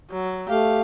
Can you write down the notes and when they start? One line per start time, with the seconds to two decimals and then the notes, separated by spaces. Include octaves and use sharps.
0.10 F#3
0.49 A3 G4 F5